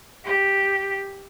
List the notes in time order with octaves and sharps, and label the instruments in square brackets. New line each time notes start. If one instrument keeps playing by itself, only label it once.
[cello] G4